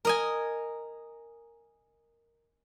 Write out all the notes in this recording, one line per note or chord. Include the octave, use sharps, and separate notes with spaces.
A#4 D#5 G#5